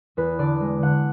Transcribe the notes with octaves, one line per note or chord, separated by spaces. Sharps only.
E2 B4
D3 D5
G#3
D3 F#5